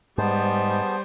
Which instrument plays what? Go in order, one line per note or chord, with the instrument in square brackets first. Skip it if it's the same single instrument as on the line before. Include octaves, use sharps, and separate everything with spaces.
[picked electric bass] G#2 [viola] G3 [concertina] B3 G#4 A5 [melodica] C5